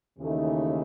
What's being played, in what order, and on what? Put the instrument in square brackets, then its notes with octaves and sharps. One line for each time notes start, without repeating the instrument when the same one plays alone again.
[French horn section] D#2 C#3 E3 A3 D#4